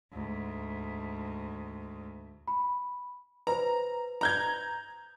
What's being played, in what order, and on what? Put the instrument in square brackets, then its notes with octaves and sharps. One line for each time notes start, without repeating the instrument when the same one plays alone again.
[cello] D2 G#2
[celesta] B5
[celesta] B4 C5 [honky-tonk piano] A#5
[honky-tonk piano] A#5 G6 G#6